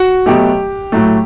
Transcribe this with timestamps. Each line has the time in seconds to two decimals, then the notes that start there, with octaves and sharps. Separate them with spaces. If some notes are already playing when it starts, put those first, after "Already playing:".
Already playing: F#4
0.26 B2 F#3 A3 G4
0.92 A2 F#3 A3